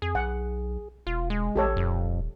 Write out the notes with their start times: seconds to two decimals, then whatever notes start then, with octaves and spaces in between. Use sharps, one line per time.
0.02 F2 G#4
0.15 B1 F#5
1.07 E1 F4
1.30 G#3
1.56 A1 G4 A4 C#5
1.77 D#1 F2